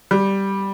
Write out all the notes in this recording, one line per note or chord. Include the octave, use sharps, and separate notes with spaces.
G3